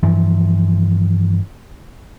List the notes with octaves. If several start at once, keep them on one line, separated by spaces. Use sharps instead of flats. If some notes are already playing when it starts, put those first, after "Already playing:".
G2 E3 F3